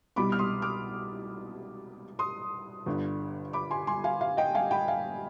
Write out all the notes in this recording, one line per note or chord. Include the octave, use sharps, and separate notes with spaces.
C2 B2 G3 B5 D6
F6
C6 D#6
D6 F6
C6 D#6
G1 G2 D3
B5 D6
G#5 C6
G#5 C6
F5 G#5
F5
D#5 G5
F5 G#5
G5 B5
F5 G#5